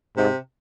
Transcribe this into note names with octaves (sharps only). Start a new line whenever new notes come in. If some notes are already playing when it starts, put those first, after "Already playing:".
G#2 C3